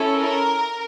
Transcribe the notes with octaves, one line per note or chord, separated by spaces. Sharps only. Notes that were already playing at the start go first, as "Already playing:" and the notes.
Already playing: C#4 E4 A4
A#4